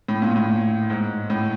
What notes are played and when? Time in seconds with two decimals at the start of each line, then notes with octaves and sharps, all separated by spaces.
0.08 A2
0.22 A#2
0.36 A2
0.90 G#2
1.30 A2